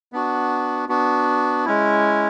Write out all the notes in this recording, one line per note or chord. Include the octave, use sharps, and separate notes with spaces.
B3 D4 F#4
B3 D4 F#4
G#3 C#4 E4